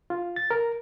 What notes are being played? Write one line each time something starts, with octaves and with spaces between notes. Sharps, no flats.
F4
A6
A#4